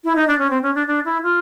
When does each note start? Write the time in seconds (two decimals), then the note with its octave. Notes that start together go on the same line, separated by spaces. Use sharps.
0.04 E4
0.16 D#4
0.28 D4
0.39 C#4
0.50 C4
0.62 C#4
0.75 D4
0.87 D4
1.05 E4
1.23 F4